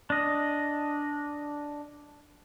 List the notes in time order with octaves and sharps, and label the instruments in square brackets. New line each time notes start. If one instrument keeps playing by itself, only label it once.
[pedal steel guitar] D4 D#5